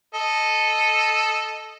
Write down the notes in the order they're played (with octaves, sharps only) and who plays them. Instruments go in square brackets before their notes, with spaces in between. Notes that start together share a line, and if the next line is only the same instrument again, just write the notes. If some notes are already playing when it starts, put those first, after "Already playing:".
[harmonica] A4 D#5